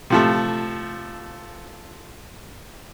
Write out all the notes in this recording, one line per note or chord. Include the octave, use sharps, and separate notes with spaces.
C3 F3 A3